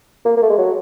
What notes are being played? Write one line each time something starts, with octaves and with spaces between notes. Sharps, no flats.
A#3
A#3
A3
G#3
F#3